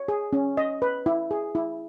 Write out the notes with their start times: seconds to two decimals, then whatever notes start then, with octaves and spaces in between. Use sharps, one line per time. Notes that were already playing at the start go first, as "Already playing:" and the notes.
Already playing: C#5
0.08 G#4
0.33 C#4
0.57 D#5
0.82 B4
1.06 E4
1.31 G#4
1.55 E4